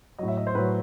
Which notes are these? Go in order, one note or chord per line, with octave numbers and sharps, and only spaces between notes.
A2 F#3 D#5
E5
D#5
C5
A2 F#3 B4